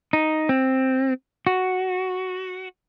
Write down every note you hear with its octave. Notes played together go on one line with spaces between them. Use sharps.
D#4
C4
F#4